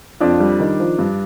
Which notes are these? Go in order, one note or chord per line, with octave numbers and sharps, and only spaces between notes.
F2 D4 F4
G3
D#3
F3
G2